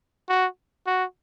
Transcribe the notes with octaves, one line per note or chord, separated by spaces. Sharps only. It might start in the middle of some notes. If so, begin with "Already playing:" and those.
F#4
F#4